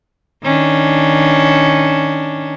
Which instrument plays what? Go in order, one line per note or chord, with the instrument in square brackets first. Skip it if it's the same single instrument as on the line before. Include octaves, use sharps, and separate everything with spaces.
[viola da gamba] D#3 C#4 D4